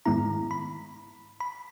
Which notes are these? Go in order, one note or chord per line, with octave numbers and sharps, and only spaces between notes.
G#2 D#3 G#3 B3 E4 A#5
B5
B5